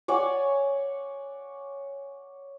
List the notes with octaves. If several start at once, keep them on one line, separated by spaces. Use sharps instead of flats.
C#5 D5 F#5 G#5